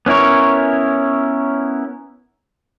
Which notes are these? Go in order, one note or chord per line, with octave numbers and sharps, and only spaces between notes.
B3 C#4 E4 A#4 C#5